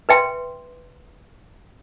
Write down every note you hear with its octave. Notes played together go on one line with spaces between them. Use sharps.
B4 E5 G5 C6